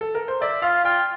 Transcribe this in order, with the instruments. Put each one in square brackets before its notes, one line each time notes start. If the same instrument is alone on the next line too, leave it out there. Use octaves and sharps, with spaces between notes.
[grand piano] A4
A#4
C5
[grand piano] D5 [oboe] E5
[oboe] F4 [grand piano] F5
[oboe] F4 [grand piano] G5